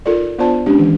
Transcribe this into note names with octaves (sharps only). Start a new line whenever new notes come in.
D#4 F4 A4 A#4 D5
B3 D4 F4 C5 D5 A5
G#3 C#4 D4 G4
D#3 E3